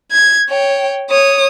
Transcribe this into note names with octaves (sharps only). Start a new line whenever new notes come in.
G#6
C#5 G5
C#5 D#6